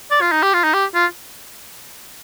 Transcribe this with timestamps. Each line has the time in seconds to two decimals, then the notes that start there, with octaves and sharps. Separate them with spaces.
0.11 D5
0.21 F4
0.32 D#4
0.43 G4
0.54 F4
0.64 D#4
0.74 G4
0.95 F4